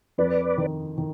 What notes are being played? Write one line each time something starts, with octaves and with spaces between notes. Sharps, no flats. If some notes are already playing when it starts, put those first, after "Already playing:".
F2 B4 D5
D#3
D#3